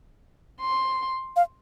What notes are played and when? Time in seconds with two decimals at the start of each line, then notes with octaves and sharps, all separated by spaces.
0.61 C6
1.36 F5